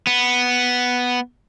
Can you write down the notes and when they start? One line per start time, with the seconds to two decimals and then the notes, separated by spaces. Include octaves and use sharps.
0.07 B3